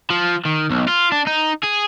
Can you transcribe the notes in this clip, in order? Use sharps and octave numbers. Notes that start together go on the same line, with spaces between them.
F3
D#3
B1
F4
D4
D#4
G#4